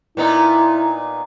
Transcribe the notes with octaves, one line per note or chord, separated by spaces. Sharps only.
A#2 B3 D#4 E4